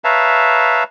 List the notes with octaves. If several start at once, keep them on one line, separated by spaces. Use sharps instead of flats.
B4 C#5 E5 F5 A5 A#5